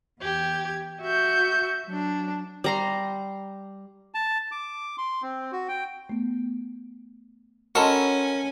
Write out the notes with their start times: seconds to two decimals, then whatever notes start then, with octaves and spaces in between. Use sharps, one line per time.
0.19 E2 G4 G#6
1.01 F#4 E5 C#6 G6
1.85 F#3 D4
2.64 G3 A#5 C6
4.14 A5
4.52 D6
4.98 C6
5.22 C4
5.52 F#4
5.68 G5
6.09 A3 B3
7.75 C#4 F#4 A4 A#4 D#5 G#5 B5 C6